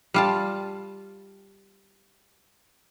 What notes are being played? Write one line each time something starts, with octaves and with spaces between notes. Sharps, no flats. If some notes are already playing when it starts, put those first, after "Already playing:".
G3 F4 A5